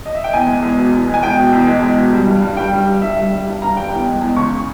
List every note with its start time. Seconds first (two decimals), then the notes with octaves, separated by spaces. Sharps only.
0.06 D#5
0.15 E5
0.24 G5
0.33 E2 G#5
0.47 G#3
0.62 E2
0.77 B2
0.93 E2
1.08 G#3
1.14 G#5
1.22 E2 G5
1.37 B2
1.52 E2
1.67 G#3
1.82 E2
1.97 B2
2.13 G3
2.27 G2
2.42 G2
2.57 G3 G5
2.72 G3
2.87 G2
3.02 G2 E5
3.17 G3
3.32 G3
3.47 G2
3.62 G2 A#5
3.77 G3 G5
3.91 E2 G5
4.07 G#3
4.22 E2
4.37 C#3 C#6